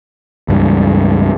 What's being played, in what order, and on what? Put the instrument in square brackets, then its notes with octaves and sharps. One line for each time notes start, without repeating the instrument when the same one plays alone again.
[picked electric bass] C#2 G2